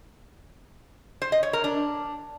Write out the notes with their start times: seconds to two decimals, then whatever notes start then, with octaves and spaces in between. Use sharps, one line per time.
1.22 C5
1.32 D#5
1.43 C#5
1.53 A#4
1.64 D4